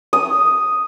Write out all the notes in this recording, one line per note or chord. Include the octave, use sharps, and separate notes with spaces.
D#6